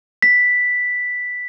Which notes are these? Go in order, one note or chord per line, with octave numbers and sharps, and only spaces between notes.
B6